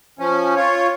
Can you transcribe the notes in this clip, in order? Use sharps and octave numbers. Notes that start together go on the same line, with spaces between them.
F3 C#4
F4 C#5